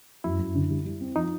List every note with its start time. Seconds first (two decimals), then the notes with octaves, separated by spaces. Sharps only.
0.24 F#2 E4
0.39 F#2
0.55 D3
0.70 G3
0.85 G3
1.01 C4
1.16 F3 D#4